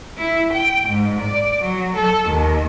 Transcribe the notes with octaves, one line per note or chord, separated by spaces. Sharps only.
E4
G5
G#2
D5
F#3
A4
D#2